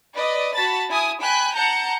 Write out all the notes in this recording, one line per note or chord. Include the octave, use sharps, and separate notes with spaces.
B4 D5 D#5
F#4 A5 B5 A6
E4 G#5 D#6
G5 G#5 B5 F#6
F#5 A5 A#5 G6 C#7